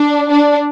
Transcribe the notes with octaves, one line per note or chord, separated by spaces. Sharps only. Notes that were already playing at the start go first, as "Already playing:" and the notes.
Already playing: D4
D4